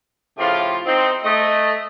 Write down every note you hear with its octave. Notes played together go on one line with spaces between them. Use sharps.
A2 C#3 F3 A3 F4 G4
C4 D#4
A3 D#5